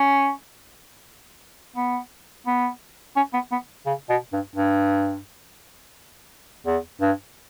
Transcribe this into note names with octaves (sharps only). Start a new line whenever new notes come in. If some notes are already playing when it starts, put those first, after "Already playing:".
Already playing: C#4
B3
B3
C#4
B3
B3
C#3
B2
G2
G2
E2
G2